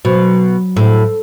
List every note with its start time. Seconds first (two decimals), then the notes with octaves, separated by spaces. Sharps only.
0.05 B2 F#3
0.77 A2